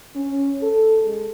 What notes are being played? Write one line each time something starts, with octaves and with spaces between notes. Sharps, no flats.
C#4
A4
G#3